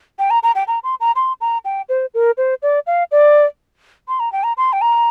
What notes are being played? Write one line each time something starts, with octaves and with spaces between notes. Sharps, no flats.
G5
A#5
A#5
G5
A#5
C6
A#5
C6
A#5
G5
C5
A#4
C5
D5
F5
D5
C6
A#5
G5
A#5
C6
G5
A#5